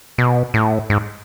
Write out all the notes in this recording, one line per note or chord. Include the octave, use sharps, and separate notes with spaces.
B2
A2
G#2